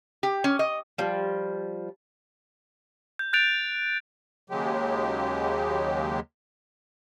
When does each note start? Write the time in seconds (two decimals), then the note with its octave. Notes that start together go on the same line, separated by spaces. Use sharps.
0.23 G4
0.44 C#4
0.59 D#5
0.98 F3 G3
3.19 G6
3.33 F#6 G6 A6 D7 F7
4.50 D#2 C#3 F#3 G#3 G4